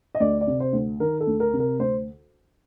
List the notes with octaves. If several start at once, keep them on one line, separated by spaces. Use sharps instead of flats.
D#5
D2 D5
D5
C3
C5
D2
D#3 A#4
A4
D2
A#4
C3
A#4
D2 C5